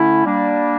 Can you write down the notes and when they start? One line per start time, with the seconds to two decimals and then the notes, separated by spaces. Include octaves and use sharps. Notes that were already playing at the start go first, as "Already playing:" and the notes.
Already playing: D3 A3 C#4 E4
0.25 G3 A#3 D4